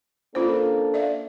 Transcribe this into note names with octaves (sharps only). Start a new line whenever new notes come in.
A#3 C#4 D4 F4 A4 C5
D5 E5 F5